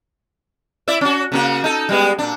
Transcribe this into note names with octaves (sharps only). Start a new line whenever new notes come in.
E4 D5 E5
C#4 F#4
C#3 A#3 F#4
D#4 A4
G3 G#3 B3
A#2 D4